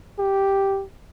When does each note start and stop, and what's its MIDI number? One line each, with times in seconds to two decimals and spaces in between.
0.19 0.84 67